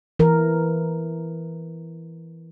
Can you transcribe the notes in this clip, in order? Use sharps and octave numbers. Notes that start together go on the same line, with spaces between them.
E3 A#4